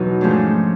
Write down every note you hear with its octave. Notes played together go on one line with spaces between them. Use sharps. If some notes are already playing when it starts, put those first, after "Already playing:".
Already playing: E2 B2 F#3 D#4
G#2 F3 A3 C#4 D4